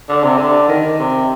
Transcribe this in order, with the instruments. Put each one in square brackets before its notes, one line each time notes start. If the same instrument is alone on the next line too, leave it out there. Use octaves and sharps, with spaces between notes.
[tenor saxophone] D3
C3
D3
D#3
C3